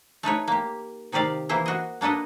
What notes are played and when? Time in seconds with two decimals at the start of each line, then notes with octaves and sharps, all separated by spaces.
0.23 A3 D#4 B4 C#5
0.48 A#3 G4
1.12 C3 D#3 G4 D5 F5
1.49 E3 A#3 E4 C5
1.66 F#4 D#5
2.01 A#3 D4 A4 B4 D#5